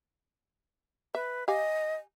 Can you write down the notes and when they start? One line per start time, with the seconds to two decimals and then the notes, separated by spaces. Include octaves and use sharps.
1.15 B4 E5
1.48 G4 D#5 F5 G#5